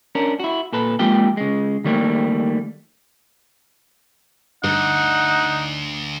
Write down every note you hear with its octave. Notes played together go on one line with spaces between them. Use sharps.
C#4 D4 A#4
E4 F#4
A#2 A4 B4
F2 G#3 A#3 F4 G4 G5
C#3 G#3
D#3 G3 A3 A#3
D2 G2 D#4 F#5